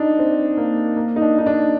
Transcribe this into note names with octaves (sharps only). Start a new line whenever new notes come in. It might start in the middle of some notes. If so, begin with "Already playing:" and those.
Already playing: D4 D#4
C4
A#3
A#3
D#4
D4
D#4
D4